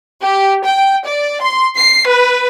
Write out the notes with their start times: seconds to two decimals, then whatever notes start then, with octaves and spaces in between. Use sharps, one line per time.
0.23 G4
0.65 G5
1.07 D5
1.41 C6
1.76 C7
2.08 B4